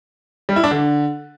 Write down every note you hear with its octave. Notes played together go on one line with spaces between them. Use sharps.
G3
E4
D4
D3